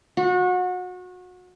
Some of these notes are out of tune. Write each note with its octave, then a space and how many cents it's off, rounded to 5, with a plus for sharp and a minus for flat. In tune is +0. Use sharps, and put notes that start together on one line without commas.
F#4 -30